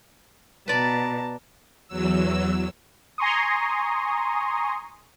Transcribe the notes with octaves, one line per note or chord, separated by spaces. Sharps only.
B2 B4 D5 A5 A#5
E2 F#3 E6
G#5 A#5 C6 C#6 D#6